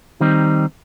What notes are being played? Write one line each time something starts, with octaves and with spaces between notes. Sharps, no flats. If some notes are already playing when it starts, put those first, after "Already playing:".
D#3 G3 C4 D#4